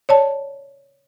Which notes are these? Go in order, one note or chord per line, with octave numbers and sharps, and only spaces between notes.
C#5 D5 A5